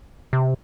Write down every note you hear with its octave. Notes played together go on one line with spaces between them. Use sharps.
C3